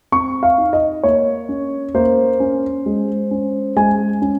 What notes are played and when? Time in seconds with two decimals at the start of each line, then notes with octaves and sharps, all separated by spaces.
0.12 C4 C#6
0.43 F5
0.58 D#4
0.73 D#5
1.03 A#3 C#5
1.49 C#4
1.94 A#3 C5
2.40 C#4
2.86 G#3
3.31 C#4
3.76 G#3 G#5
4.22 C#4